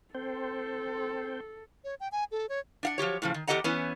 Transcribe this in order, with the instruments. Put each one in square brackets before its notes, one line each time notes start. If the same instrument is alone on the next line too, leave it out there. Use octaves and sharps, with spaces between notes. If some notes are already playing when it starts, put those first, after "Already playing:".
[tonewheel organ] C4 C5 G5 [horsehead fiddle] A4
[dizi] C#5
G5
G#5
A4
C#5
[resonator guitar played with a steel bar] D4 F5 F#5
F3 F#3 G4 C#5
A2 C#3 F3
D#3
E2 G4 A4 D#5 F#5 A#5
E3 B3 C#4